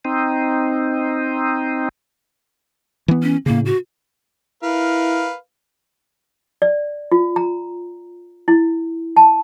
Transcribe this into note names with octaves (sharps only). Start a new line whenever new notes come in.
C4 D#4
E3 B3
C#4
A2 C#3 A#3
F#4
E4 A#4 B4 F5
D5
F4
A#5
E4
A5